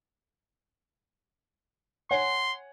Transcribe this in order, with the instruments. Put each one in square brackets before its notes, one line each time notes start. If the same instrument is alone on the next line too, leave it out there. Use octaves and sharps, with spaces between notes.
[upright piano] C#5 F#5 G#5 [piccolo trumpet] C6